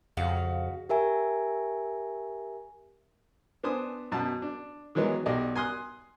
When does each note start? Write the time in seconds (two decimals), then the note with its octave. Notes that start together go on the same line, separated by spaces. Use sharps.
0.17 F2 C#3 F#4 F5
0.89 G4 A#4 E5 G#5
3.63 B3 D4 C5 G#5 D#6
4.12 F#2 B2 A5
4.42 D4
4.95 D#3 E3 F#3 G#3 B3
5.26 B1 G4 D5 D#5
5.56 G#5 C6 D#6 F#6